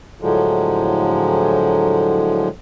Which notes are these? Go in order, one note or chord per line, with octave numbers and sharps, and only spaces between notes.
A2 D3 F3 F#3 G#3